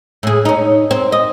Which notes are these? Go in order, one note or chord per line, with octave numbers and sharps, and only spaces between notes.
A2 G#4
C#4 D#4
C4
D#5